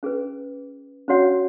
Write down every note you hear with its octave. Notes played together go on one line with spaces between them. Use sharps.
C#4 G#4 B4
C#4 F#4 C#5 F#5